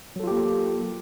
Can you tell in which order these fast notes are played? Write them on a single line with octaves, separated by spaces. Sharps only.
F#3 A4 F4 G4 A#3